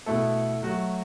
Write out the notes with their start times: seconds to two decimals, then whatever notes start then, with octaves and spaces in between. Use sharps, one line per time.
0.06 B2 A3 E4 A4
0.63 F#3 A3 F#4